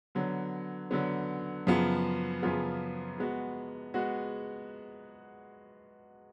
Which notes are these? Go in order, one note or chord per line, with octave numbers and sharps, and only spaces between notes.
D3 F#3 B3
D3 F#3 B3
F#2 C#3 F3 B3 F4
F#2 C#3 F3 B3 F4
G#3 B3 F#4
G#3 B3 F#4